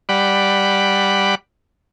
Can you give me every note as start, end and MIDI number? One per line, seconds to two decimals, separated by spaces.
0.09 1.35 55
0.09 1.35 74
0.09 1.35 78
0.09 1.35 83